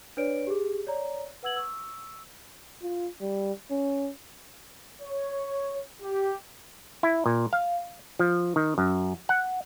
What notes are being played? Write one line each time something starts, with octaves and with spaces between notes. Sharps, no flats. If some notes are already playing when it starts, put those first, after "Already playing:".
D4 B4 C#5 D5 D7
G4 G#4
C#5 D5 A#5
B4 F#5 E6 G#6 F#7
C#6 E6
F4
G3
C#4
C#5
G4
E4
A#2
F5
F3
D#3
F#2
F#5